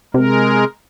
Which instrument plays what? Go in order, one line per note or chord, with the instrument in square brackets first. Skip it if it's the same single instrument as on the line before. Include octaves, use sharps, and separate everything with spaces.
[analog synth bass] C3 [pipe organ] G#3 A#4